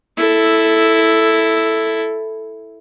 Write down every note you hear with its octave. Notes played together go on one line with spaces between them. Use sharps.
E4 A4